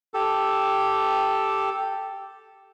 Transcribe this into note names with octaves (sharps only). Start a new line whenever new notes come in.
G4 A4